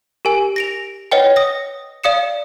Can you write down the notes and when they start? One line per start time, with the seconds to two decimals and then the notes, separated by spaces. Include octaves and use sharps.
0.25 G4 A#4 G#5
0.56 A#6 D7 F7
1.11 B4 C#5 D#5 F#5 G5
1.36 D#6 A#6
2.04 D5 F5 D#6 C#7 E7